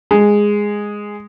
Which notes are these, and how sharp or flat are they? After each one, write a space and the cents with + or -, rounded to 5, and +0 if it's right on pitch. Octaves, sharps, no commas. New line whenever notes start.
G#3 -5